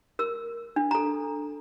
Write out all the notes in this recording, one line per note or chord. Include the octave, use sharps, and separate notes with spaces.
A#4 E6
D4
A4 A#5